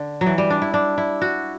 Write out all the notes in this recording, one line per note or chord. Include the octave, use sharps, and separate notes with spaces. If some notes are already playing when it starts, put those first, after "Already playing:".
Already playing: D3
F#3
E3
G3
D4
E4
D4
E4
F#4